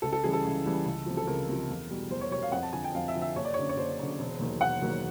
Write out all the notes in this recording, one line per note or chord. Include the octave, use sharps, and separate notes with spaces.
C#2 A4
A4
C#3 E3 G3 G#4
A4
C#2
C#3 E3 G3
C#2
C3 F3
A4
C#2 A#4
C3 F3
E2
B2 G3
E2 C5
C#5
B2 G3 C#5
F5
F2 F#5
A5
D3 F3 G#5
G5
F2 F5
E5
D3 F3
E5
F#1 C#5
D5
F#2 D3 C#5
C#5
F#1 C5
F#2 D3
E1
D#2 D#3 F#3
E1 F#5
D#2 D#3 F#3